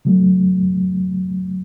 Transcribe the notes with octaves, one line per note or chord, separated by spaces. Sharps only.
C#3 F#3 A3